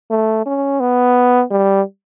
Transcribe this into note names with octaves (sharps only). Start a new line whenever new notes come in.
A3
C#4
B3
G3